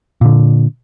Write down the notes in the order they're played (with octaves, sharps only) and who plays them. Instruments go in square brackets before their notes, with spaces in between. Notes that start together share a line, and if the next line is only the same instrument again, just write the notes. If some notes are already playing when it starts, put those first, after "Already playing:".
[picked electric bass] A#2 D3